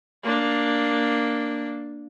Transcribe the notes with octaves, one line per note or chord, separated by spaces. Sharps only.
A#3 D4